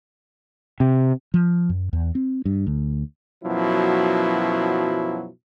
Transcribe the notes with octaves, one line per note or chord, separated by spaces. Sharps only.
C3
F3
F#2
E2
C4
G2
D2
F#2 B2 F3 F#3 E4